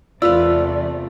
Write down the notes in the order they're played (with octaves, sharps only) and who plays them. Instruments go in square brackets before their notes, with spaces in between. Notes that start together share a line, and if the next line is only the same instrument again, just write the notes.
[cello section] E2 C3 A3 [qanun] F4 B4 F5 [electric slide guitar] D5 [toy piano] E6